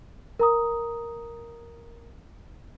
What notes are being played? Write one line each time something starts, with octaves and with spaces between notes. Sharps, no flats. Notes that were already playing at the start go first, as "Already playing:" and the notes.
A#4 A#5 D#6